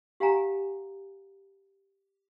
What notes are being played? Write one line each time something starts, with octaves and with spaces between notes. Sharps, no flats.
G4 F5 F#5 G#5 A#5